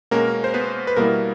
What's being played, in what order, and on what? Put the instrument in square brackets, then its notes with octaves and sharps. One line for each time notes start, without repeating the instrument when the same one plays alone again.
[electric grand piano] B2 G#3 A#3 C#4 A#4
C5
B3 B4
B4
B2 G3 A#3 B3 E4 A#4